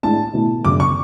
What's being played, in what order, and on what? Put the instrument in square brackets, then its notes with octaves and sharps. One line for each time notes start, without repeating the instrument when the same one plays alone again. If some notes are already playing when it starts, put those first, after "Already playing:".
[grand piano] A2 G#3 D4 [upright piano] A5
[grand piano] B2 A3 E4
[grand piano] F#2 C#3 F#3 B3 D4 [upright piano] D6
[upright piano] C#6